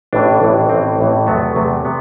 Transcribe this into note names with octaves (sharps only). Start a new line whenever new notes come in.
A1 A2 E3 D4
A1 A2 E3
A1 A2 E3 C4
A1 A2 E3
E2 C3 F#3 A3 B3
E2 C3 F#3 A3
C3 B3